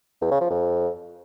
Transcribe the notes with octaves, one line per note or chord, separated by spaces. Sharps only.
E2
C#3
F3
F2